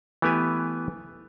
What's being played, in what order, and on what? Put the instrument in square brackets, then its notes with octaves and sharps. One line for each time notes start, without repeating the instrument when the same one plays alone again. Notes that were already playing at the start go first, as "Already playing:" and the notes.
[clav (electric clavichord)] E3 A3 B3 G4 B4 G#5